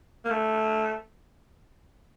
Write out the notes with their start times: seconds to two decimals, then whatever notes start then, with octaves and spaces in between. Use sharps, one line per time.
0.25 A#3
0.30 A3